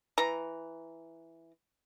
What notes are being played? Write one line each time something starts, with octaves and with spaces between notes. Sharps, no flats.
E3 A#5